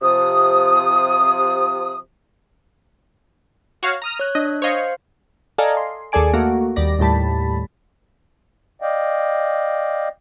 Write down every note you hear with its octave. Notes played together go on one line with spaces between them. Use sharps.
C3 F3 D#6
F#4 C#5 F5
A#5 D#6 F6
C#5 F#6
D4 D#5
C5 C#5 D#5 F5
A4 D5 D#5 F5 G#5 A#5
C6
D#2 G#4 A4 D5 G#5 D7
A3 A#3 F#4
D#2 G3 D5 A#6
D#2 A2 G3 A5 B5
D5 D#5 F5 G5